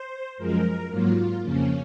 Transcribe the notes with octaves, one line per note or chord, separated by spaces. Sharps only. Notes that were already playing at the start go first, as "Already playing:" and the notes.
Already playing: C5
F#2 F3 G#3 A#4
G#2 F#3 A#3 F4
F2 C#3 F3 A#3 C#4